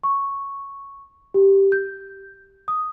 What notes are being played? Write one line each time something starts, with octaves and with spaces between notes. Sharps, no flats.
C#6
G4
G6
D#6